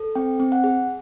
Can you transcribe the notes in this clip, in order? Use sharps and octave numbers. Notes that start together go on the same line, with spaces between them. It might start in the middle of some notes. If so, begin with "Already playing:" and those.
Already playing: A4
C4 G5
C4
F#5
G#4